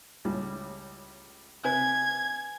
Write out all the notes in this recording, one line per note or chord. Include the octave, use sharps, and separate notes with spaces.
C#2 A2 G3
C3 B4 G#5 G#6